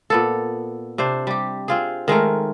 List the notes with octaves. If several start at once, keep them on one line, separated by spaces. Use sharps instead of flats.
A#2 B3 A4
C3 D4 C5
G3 G4
C4 F4 G#4
D#3 G#3 A3 A#4